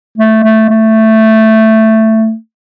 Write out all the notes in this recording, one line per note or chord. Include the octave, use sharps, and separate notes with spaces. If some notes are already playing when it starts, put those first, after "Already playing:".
A3
A3
A3